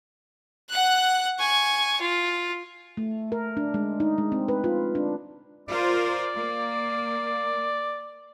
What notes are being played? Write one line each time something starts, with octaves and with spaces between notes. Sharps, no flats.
F#5 F#6
G#5 C#6
F4
A3
A#4
D4
G#3
D#4
G#3
C4
B4
F4
D4
F4 A#4 C5 D5
A#3